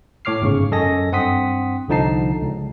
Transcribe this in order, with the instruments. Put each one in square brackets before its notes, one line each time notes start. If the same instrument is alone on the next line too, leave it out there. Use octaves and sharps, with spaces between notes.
[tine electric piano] A2 C#5 D6 F6 C7
G1 G#2 C#3 C#6
F#2 A4 D#5 G#5 A#6
G2 C4 F#5 C6 D#6 B6
C2 D3 F3 D#4 A5 C7
C#2